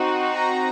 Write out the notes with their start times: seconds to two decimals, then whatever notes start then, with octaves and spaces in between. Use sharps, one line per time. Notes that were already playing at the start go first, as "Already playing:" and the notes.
Already playing: C4 D#4 F#4
0.33 A#5